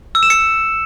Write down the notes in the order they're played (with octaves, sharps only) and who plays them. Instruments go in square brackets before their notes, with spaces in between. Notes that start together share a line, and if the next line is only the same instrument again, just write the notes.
[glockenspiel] E6
E7
C#7